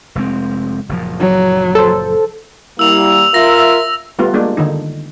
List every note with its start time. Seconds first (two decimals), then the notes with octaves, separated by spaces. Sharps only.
0.15 F1 G#3 C4
0.89 F#1 A#2 F3
1.20 F#3
1.75 A4 C5
2.79 G3 A#3 E4 E6 F7
3.34 F4 A#4 E5 A#6
4.19 G3 A3 B3 F4
4.34 G#3 A#3 D4
4.57 D3 D#3 D#4